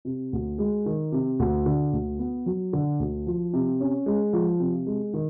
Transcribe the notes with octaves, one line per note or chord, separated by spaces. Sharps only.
C3
D2
G#3
D#3
C3
D2
D3
D2
B3
F#3
D3
D2
F3
C3
C#4
G#3
F3
C3
G#3
D#3